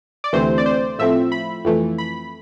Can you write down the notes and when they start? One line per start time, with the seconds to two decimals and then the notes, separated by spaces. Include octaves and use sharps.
0.24 D5
0.33 D2 C3 E3 A3 C4 C5
0.58 D5
0.66 C5
0.99 A2 F3 A3 C4 E5
1.32 B5
1.64 F2 E3 A3
1.98 B5